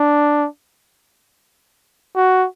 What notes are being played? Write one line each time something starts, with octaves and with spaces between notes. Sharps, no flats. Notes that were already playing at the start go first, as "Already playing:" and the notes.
Already playing: D4
F#4